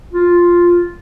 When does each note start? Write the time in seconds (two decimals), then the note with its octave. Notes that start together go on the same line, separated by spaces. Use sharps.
0.13 F4